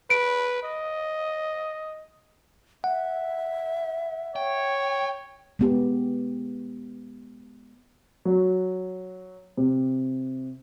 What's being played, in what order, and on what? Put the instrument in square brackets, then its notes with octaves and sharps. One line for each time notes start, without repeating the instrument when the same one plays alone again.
[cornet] B4 [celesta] D7
[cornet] D#5
[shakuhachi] E5 [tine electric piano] F#5
[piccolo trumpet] C#5 [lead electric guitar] G5
[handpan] G#3 B3 G4
[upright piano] F#3
C3